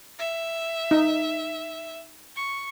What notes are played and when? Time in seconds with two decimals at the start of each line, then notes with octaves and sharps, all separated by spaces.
0.19 E5
0.91 D#4
2.36 C#6